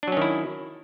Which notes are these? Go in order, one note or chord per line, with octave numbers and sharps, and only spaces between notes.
D#3 F#3 C#4 D4 E4